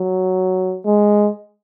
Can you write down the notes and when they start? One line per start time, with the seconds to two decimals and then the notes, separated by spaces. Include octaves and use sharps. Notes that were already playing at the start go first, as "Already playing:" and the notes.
Already playing: F#3
0.86 G#3